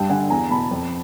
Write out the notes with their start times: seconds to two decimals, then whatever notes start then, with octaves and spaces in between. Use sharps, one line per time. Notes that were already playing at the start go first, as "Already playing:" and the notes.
Already playing: G2 G5 A5
0.10 D3 F#5 G#5
0.30 E2 G#5 A#5
0.50 B2 A5 B5
0.71 F2